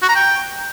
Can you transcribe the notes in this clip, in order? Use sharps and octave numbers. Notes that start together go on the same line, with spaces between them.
F#4
A#5
G5